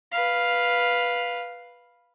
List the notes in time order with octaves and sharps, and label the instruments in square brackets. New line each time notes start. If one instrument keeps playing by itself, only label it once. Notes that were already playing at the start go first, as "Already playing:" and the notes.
[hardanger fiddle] B4 F5